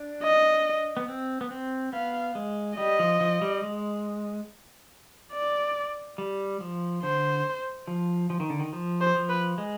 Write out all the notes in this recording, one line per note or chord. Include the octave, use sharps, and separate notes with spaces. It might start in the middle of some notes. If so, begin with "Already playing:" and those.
Already playing: D4
D#5
B3
C4
B3
C4
B3 F5
G#3
G3 D#5
F3
F3
G3
G#3
D5
G3
F3
D3 C5
F3
F3
D#3
D3
D#3
F3
C5
F3
B4
G#3